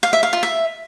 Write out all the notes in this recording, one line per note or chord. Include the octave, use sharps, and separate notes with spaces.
F5
E5
F5
F4
E5